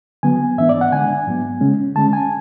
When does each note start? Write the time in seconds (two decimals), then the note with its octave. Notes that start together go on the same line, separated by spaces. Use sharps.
0.23 D3 F#3 B3 G#5
0.58 G#2 E3 B3 D4 E5
0.69 D5
0.81 F#5
0.92 D3 G#3 D4 G#5
1.27 G#2 F#3 B3
1.61 C#3 G#3 C#4
1.95 D3 G#3 C#4 A5
2.13 G#5